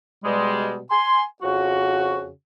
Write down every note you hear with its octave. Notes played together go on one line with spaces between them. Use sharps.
B2 G3 G#3
G#5 C6
F2 C#3 F3 F#4